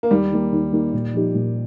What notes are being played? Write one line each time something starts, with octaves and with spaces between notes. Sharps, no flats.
A#3
D#2 G3
D#3 A#3 G4
D#2
D#3 A#3 G4
A#2
F3 D#4 G4
A#2